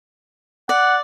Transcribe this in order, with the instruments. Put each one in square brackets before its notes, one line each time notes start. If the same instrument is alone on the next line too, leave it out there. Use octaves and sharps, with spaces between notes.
[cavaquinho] D5 [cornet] F#5